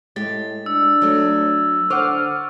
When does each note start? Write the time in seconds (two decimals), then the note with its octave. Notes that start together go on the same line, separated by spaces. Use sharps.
0.16 A2 G#3 G4 A6
0.66 D4 E6
1.02 F#3 A3
1.90 D3 C5 F#5 C#6 D6 F6